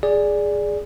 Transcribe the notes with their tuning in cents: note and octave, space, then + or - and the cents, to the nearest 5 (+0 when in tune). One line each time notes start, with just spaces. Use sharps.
G#4 -5 D5 +0